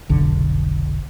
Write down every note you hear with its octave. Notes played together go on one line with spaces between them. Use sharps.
F1 B1 D3